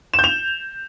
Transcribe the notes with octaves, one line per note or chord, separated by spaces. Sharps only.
E7
G6
F7